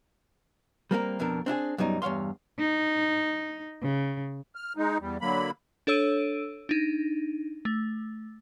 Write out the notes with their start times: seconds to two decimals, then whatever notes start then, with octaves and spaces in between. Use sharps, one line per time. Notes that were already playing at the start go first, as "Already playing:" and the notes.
0.91 G3 A#3 C4 A#4
1.20 F2 B2 D4 A#4
1.46 C4 D4 E4 G#4
1.78 F#2 B2 G3 D#4
2.02 E2 G2 C#5 F5 C6
2.59 D#4
3.82 C#3
4.55 F6
4.77 G#3 D#4
5.00 E2 G3
5.21 D3 F#3 A#3 B5
5.87 D4 A4 C#5 E6 D7 D#7
6.69 D4 D#4
7.65 A3